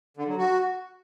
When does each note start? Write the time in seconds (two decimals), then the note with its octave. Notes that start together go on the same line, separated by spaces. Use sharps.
0.17 D3
0.27 F#3
0.38 F#4